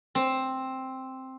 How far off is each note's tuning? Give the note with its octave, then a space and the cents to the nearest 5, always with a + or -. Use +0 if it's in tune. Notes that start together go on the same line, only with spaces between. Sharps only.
C4 +5